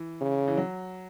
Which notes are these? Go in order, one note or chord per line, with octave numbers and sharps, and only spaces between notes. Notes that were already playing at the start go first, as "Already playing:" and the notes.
Already playing: E3
C#3
E3
F#3